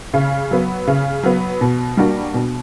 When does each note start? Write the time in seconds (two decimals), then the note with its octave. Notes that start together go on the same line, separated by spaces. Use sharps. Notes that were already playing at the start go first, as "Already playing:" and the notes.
0.14 C#3
0.51 F#3 B3
0.87 C#3
1.23 F#3 B3
1.61 B2
1.97 G3 A#3 D4 F#4
2.34 B2